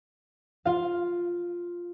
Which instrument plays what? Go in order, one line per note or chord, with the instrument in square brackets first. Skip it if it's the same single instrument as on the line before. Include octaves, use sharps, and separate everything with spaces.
[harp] F4 F5